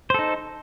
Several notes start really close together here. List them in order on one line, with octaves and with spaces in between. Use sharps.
C5 A4 D#4